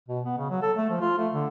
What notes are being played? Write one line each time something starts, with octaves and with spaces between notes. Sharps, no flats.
B2
B3
C#3
F#3
A4
A3
F3
F4
A3
D3